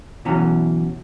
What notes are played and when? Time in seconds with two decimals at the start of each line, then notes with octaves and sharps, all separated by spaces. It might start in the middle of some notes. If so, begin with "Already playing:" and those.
0.25 B2 E3 F#3 C#4 A#5